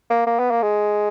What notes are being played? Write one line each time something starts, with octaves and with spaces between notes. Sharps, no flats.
A#3
A#3
B3
A#3
G#3